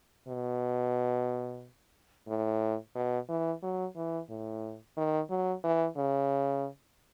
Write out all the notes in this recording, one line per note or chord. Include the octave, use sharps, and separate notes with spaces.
B2
A2
B2
E3
F#3
E3
A2
D#3
F#3
E3
C#3